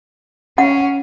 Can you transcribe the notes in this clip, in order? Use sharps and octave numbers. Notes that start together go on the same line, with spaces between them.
C#4 F#5